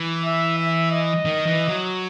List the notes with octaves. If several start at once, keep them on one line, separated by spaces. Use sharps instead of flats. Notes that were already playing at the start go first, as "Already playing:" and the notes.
Already playing: E3
E5
E5
D#5
D#3
E3
F#3